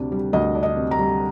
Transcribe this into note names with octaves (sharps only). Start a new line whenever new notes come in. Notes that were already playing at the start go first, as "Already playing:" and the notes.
Already playing: D2 C3 D4
G3
D2 D#5
D4
D#5
C3
A#5
G3